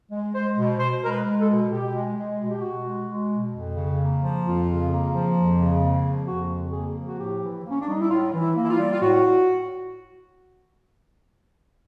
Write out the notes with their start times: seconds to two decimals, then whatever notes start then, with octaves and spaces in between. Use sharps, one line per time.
0.11 G#3
0.33 G#3 C5
0.57 B2
0.79 B2 C5
1.03 G#3 A#4
1.10 B4
1.26 G#3
1.40 A4
1.48 B2
1.71 B2 G4
1.94 G#3
2.16 G#3
2.39 B2
2.51 G4
2.61 B2 F#4
2.84 G#3
3.07 G#3
3.31 B2
3.53 F2
3.76 C#3
3.99 A#3
4.22 F3
4.44 F2 F4
4.67 C#3
4.91 A#3
5.13 F3
5.36 F2
5.59 C#3
5.82 A#3
6.05 F3
6.26 F2 F#4
6.49 C#3
6.73 A#3 G#4
6.95 F3
7.07 F#4
7.18 A2 G4
7.42 E3
7.64 A#3
7.70 C#4
7.80 D4
7.87 G3 D#4
8.00 E4
8.10 A2 F4
8.32 E3
8.41 E4
8.56 A#3
8.64 E4
8.70 F4
8.78 G3
8.93 F4
9.01 A2 F#4